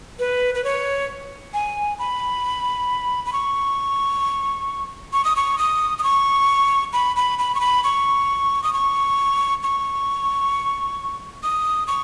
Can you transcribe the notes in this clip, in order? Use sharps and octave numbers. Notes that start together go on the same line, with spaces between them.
B4
B4
C#5
G#5
B5
B5
C#6
C#6
D#6
C#6
D#6
D#6
C#6
B5
B5
B5
C#6
B5
C#6
D#6
C#6
C#6
D#6
C#6